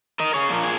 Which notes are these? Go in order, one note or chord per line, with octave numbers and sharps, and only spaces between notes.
A#4 D#5
G#4 C#5
A#2 F3 A#3
G#4